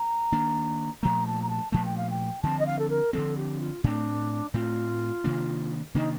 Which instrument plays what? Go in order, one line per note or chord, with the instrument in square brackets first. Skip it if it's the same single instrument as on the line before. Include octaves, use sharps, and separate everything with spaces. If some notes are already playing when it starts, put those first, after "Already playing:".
Already playing: [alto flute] A#5
[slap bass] D#3 A#3 D4
[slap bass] A#2 F3 A3 [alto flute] A#5
[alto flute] A5
A#5
A5
[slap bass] A#2 F3 A3 [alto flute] A5
[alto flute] G5
F5
G5
[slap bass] D3 F3 C4 [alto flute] A5
[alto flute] D#5
F5
A4
A#4
[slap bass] D3 F3 C4 [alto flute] A4
[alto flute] G4
F4
[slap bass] A2 A3 C4 [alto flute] D4
[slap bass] A2 A3 C4 [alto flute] F4
[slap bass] C3 D#3 A#3 D4
[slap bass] C3 D#3 A#3 D4 [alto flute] D#4